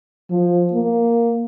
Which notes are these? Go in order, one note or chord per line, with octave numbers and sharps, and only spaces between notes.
F3
A#3